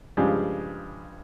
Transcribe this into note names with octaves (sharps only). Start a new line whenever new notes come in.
G2 C#3 F3 G3 G#3